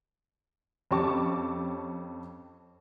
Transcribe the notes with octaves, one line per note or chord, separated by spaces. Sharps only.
F2 C#4 G4 A5 C#6 D6